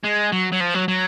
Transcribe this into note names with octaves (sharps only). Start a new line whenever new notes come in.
G#3
F#3
F#3
F3
F#3
F#3